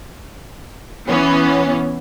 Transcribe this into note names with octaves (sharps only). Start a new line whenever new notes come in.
E3 B3 C#4